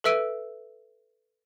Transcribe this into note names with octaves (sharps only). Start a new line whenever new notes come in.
A4 B4 E5 E6 D7 D#7